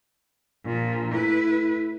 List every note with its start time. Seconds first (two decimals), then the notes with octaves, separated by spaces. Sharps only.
0.65 A#1 A#2 F3
1.12 A2 E4 B4